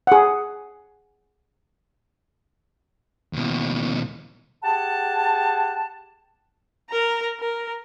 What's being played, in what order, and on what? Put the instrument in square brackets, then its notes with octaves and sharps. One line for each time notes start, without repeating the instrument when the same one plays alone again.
[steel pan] G#4 F#5
[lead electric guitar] D#2 B2
[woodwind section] G4 G#4 F#5 A5
[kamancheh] A#4 A#5
A#4